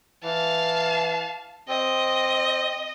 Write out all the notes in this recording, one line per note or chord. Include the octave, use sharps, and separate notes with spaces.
E3 F5 A5
C4 D#5